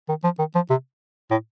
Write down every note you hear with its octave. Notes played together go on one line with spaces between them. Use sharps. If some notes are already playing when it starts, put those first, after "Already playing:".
D#3
F3
D#3
F3
C3
A2